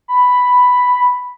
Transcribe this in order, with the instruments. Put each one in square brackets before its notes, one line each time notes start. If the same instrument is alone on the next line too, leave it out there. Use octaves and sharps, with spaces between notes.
[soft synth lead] B5